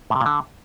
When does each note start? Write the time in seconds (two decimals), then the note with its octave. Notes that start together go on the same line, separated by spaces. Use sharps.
0.10 A2
0.15 C3
0.21 A#2
0.26 D3